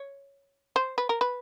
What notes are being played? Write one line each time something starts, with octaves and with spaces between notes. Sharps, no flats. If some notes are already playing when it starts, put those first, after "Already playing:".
Already playing: C#5
C5
B4
A#4
B4